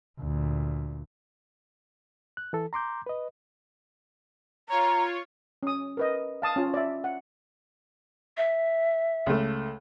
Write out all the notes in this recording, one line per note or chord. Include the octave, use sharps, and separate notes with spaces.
D2 A#2
F#6
E3 A4
A#5 C6 D6 G6
B4 D#5
F4 C#5 A#5
C#4 D#6
A#4 B4 D#5
F5 A5 D#6
C#4 F4
D5 E5
F#5
E5
C#2 A3